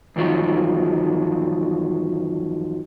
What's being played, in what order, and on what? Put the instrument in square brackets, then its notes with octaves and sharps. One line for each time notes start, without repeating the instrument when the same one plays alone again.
[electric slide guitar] E2 G2 D#3 F3 F#3